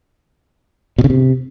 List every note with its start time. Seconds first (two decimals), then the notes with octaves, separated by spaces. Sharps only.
0.98 B2
1.04 C#3
1.10 C3